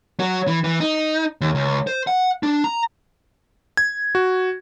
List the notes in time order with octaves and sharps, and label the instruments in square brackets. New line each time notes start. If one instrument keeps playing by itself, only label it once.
[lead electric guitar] F#3
E3
E3
D#4
D#2
C#2
C5
F#5
D4
A#5
[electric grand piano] G#6
F#4